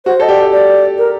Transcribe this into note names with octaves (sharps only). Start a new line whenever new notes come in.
F#4 C5
A4 D#5
G4 D5
G4
D5
A#4